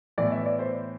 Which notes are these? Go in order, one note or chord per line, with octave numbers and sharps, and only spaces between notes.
A2 E3 B3 D5
E5
D5
C5